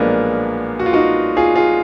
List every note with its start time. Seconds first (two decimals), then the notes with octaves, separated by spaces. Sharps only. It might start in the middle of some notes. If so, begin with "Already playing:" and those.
Already playing: B1 A#2 F3 G#3 A#3 B3 D4
0.79 F#4
0.86 F4
0.93 D#4 F#4
1.37 F4 G#4
1.55 F4 G#4